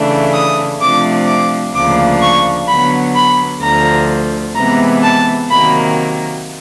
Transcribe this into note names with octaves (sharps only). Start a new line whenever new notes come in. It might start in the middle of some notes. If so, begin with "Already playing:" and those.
Already playing: C#3 E3 A3 D4
D#6
C3 F3 A3 D4 D6
D6
D2 C#3 F3 A#3 D4 D6
C#6
D3 F#3 B3 B5
B5
D2 D3 F3 A#5
C3 E3 G#3 B3 A#5
A5
C3 D#3 F#3 A#3 B5